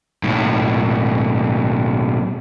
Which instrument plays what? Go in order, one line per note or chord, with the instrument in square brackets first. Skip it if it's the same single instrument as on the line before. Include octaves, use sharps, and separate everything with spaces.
[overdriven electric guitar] B1 A2